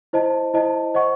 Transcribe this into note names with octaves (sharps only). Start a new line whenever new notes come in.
E4 C5 D#5 A5
E4 C5 D#5 A5
C5 D#5 F#5 C#6